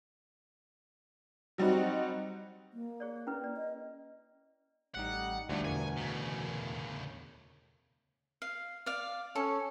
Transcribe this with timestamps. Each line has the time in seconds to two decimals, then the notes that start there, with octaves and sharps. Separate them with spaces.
1.58 F#3 G3 C4 D#4 F#4
2.73 A#3
3.00 G#4 C#5 D5
3.27 C#4 E4 B4
3.44 D5
3.57 D#5
4.95 A1 G3 D#4 F#5
5.49 D2 E3 F3 G3 A3 D4
5.65 E2 B2 A#4 G#5
5.97 A2 C#3
8.42 F5
8.86 D5 F5
9.36 C#4 A4